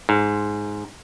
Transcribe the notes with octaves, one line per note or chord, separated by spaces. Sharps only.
G#2